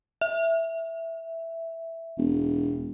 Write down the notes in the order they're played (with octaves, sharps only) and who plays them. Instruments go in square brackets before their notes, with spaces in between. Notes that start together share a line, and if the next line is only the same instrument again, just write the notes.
[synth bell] E5
[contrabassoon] E1